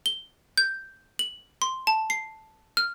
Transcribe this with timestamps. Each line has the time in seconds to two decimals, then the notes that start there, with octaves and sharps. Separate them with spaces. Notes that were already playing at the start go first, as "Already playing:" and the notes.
0.06 G7
0.58 G6
1.19 F#7
1.62 C6
1.87 A5
2.10 C7
2.77 F6